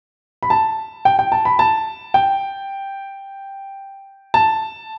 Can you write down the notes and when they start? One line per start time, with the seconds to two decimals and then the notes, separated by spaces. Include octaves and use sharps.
0.43 B5
0.50 A5
1.05 G5
1.19 G5
1.32 A5
1.45 B5
1.59 A5
2.14 G5
4.34 A5